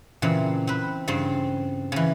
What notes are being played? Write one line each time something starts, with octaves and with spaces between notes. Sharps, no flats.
A#2 C#3 E3 C4
C4 B4
G2 C#3 C4
C#3 E3